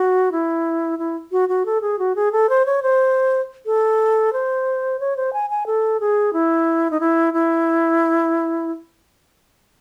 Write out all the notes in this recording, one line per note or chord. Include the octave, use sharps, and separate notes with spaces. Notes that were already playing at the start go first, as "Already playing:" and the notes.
Already playing: F#4
E4
E4
F#4
F#4
A4
G#4
F#4
G#4
A4
C5
C#5
C5
A4
C5
C#5
C5
G#5
G#5
A4
G#4
E4
D#4
E4
E4